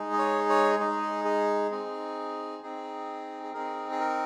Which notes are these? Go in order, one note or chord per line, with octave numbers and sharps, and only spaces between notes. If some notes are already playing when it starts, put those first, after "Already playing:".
Already playing: G#3 D#4 G#4
D#5
C#5
C#5
G#3 D#4 G#4
G#4
C4 D#4 G#4
C4 D#4 G#4
G#4
C4 D#4 G#4 A#4
G#4
A#4